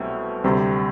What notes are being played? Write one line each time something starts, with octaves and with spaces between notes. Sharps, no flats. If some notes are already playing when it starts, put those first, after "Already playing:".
Already playing: C2 B2 F#3 A3 C4
D2 C3 G3 C4